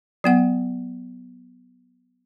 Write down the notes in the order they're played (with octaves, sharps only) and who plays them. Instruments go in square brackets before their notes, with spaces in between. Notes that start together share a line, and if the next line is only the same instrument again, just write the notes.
[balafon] F#3 B3 F#5